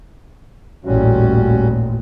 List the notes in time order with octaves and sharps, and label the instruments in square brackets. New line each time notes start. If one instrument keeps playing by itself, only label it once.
[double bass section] A1 D#2 A#2 [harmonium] G3 C#4 F#4